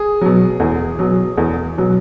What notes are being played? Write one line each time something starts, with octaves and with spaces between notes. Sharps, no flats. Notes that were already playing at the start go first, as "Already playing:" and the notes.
Already playing: G#4
B2 F#3
E2
B2 F#3
E2
B2 F#3